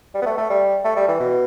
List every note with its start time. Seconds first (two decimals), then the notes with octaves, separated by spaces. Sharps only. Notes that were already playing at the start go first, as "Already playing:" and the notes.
0.14 G3
0.22 B3
0.26 A3
0.38 A3
0.50 G3
0.84 A3
0.96 G3
1.08 E3
1.20 B2